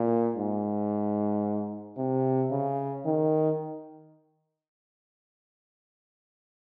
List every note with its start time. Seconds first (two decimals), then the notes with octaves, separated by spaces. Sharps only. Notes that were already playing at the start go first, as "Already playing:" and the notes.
Already playing: A#2
0.36 G#2
1.97 C3
2.51 C#3
3.05 D#3